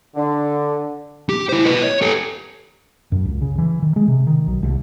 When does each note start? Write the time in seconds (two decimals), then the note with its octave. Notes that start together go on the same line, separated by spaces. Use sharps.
0.15 D3
1.29 G4
1.49 E4 C5
1.65 B4 D#5
1.83 C#5
2.02 G4 A4
3.12 F#2
3.25 C#2
3.42 C#3
3.58 E3
3.82 D#3
3.96 G#3
4.08 C3
4.27 D#3
4.47 B1
4.63 C2